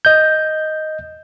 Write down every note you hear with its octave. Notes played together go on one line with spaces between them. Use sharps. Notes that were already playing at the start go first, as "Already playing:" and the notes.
D#5 G6